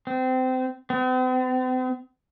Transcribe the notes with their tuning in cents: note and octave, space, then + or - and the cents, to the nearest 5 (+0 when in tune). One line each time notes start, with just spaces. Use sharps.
C4 -25
C4 -45